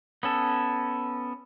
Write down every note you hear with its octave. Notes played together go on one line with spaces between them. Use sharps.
B3 C#4 A4